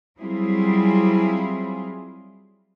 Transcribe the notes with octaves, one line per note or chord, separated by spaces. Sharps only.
F#3 G3 C4 E4 F4 G#4